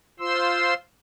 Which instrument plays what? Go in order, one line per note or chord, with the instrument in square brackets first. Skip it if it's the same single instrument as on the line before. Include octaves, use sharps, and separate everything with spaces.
[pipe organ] F4 C5 C6 E6